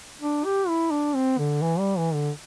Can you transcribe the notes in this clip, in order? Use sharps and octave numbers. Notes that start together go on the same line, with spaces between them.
D4
G4
E4
D4
C4
D3
E3
G3
E3
D3